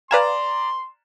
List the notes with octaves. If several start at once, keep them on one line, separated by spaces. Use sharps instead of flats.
B4 D5 F5 G#5 A#5 C6 E7